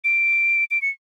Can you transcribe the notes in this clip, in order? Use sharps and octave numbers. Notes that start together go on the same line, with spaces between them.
D7
D7
C#7